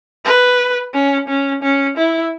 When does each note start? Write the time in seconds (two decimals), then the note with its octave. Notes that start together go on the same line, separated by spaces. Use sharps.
0.25 B4
0.94 C#4
1.28 C#4
1.63 C#4
1.97 E4